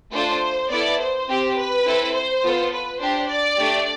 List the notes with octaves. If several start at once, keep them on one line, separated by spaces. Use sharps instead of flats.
A3 D4 F4 A4 C5
B3 E4 A4 D5
C5
C4 G4
B4
C4 E4 A4
C5
B3 F4 A4
B4
D4 G4 C5
D5
A3 D4 G4